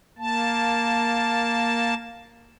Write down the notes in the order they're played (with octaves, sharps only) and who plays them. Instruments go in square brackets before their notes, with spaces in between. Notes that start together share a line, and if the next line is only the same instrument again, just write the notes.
[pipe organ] A#3 A5